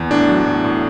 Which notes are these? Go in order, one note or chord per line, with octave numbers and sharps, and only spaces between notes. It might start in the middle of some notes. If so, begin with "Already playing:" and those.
Already playing: E2
A2 D4
F#3
A2
A2